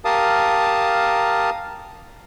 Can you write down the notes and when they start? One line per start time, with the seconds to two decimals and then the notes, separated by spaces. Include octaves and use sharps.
0.05 G4 A#4 F5 A5 D#6